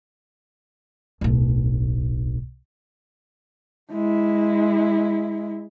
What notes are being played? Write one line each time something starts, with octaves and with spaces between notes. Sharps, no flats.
D1 B1
G#3 E4